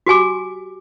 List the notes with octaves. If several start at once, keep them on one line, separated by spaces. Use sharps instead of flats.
F#4 G4 G#5 D6